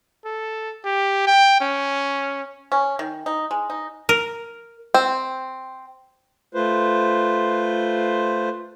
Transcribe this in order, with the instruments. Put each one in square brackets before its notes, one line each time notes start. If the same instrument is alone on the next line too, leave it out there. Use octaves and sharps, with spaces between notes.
[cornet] A4
G4
G5
C#4
[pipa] C#4
D#3
D#4
G#3
D#4
[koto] A#4
[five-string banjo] C4
[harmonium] A3 F4 B4 C5